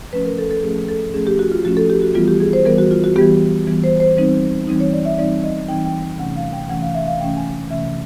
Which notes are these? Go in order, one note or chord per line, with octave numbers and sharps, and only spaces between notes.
F3 A3 C#4 B4
A#4
A4
A4
F3 A3 C#4 G#4
A4
F3 A3 C#4 G#4
G4
F#4
F4
F3 A3 C#4 F#4
A4
G4
F#4
E3 G3 B3 F4
G4
G#4
C5
E3 G3 B3 A#4
F#4
F4
F#4
E3 G3 B3 G4
E3 G3 B3
C5
C5
E3 G3 C4 D#4
E3 G3 C4 D#4
C#5
D5
E5
E3 G3 C4 D#4 D5
D#5
E3 G3 C4 D#4 G5
G5
C3 E3 A3 C#4 F#5
F5
G5
C3 E3 A3 C#4 F#5
F5
E5
F5
C3 E3 A3 C#4 G5
G#5
C3 E3 A3 C#4 E5